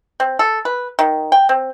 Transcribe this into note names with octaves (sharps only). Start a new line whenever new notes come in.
C4
A4
B4
D#3
G5
C4